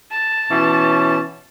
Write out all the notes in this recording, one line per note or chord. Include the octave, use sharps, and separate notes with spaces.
A5
B2 E3 C#4